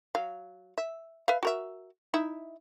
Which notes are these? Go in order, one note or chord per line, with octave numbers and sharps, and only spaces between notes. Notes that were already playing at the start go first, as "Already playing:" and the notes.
F#3 F5
E5
B4 E5 F5
F#4 A#4 E5
D#4 E4 E5